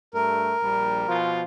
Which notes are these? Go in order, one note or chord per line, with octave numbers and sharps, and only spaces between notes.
G2 A3 A#4
A#1 G3
B2 F3 F4